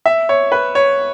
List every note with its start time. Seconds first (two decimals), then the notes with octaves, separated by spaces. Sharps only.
0.06 E5
0.29 C#5
0.52 B4
0.75 C#5